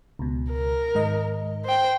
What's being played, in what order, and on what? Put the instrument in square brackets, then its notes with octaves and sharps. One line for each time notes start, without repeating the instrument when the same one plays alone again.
[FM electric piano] C#2 B2
[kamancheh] A#4
[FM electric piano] G#2 D#3 D#5
[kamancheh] C5 G5